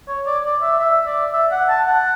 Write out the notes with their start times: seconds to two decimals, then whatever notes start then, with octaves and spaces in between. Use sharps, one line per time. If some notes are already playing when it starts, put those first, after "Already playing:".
0.08 C#5
0.26 D5
0.44 D5
0.62 E5
0.80 E5
1.06 D5
1.33 E5
1.51 F#5
1.69 A5
1.87 F#5